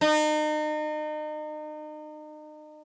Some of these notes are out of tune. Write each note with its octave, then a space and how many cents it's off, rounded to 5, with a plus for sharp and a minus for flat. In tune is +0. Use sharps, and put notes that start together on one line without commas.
D#4 -35